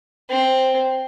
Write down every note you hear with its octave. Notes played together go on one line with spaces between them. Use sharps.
C4